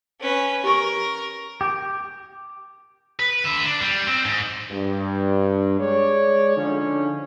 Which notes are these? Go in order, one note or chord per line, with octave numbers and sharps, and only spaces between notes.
C#4 B4
G4 A#4 C#6
G4
B4
D3 E5
D4
G3
C4
G#2
G2
G#3 C#5 D5
D3 F3 C#4 D#4